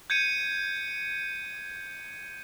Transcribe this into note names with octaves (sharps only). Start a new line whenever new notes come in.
G6 G#6 C#7 D#7